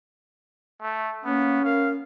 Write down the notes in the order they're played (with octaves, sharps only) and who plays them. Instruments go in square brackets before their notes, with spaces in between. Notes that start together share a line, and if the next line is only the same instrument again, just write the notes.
[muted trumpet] A3
[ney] A#3 [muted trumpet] B3 [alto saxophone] C#4
[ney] A#4 [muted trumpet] F5